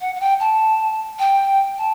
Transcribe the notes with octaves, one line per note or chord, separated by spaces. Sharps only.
F#5
F#5
G5
A5
G5
A5